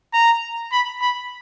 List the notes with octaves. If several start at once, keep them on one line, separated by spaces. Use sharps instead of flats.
A#5
B5
B5